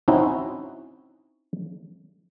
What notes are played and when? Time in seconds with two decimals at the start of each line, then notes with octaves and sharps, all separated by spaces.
0.08 C4 C#4 D#4 E4 F#4